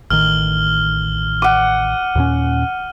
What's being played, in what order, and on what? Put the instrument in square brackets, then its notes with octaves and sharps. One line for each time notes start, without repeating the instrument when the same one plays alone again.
[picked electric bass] A1 D#3 [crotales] F6 G7
[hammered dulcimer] F#5 D6 [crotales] D#7
[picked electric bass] D#2 A#2 C#4